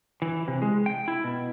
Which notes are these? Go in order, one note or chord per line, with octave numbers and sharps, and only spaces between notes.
E3
C3
G#3
G5
E4
B2